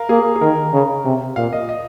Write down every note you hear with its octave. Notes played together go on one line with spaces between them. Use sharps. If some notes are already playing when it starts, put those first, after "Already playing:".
Already playing: A#4 F5
A#3 G#4
G#4
D#3 A#4
C#3
C3
A#2 F5
D#5
D#5